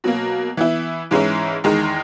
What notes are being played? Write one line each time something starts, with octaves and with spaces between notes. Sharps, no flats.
B2 F#3 A#3
E3 B3 E4
G#2 E3 G#3 C#4 E4
E2 D#3 G#3 D#4